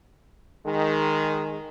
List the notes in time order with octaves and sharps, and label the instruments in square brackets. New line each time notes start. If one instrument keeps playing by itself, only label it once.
[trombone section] D#3 G#3